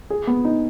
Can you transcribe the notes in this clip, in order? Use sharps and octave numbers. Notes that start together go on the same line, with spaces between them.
G#4
B3
D#4